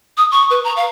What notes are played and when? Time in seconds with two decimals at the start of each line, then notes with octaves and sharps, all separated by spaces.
0.17 D#6
0.31 C#6
0.50 B4
0.64 A#5
0.76 F5